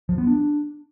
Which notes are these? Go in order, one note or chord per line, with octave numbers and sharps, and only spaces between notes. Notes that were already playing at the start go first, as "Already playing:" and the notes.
F3
B3
D4